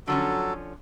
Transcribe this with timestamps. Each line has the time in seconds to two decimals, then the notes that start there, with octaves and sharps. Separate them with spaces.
0.07 D3 F3 F#3 C#4 A4